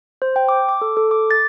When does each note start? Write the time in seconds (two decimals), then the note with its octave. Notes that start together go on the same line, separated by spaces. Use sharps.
0.22 C5
0.36 G5
0.49 D6
0.69 D6
0.81 A4
0.97 A4
1.11 D6
1.31 A6